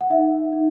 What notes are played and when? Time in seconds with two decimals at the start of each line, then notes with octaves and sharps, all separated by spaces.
0.01 F#5
0.10 D#4 E5
0.52 D#4